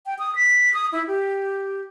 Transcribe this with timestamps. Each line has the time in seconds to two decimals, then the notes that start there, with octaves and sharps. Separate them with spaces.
0.06 G5
0.19 D#6
0.35 B6
0.74 D#6
0.92 E4
1.07 G4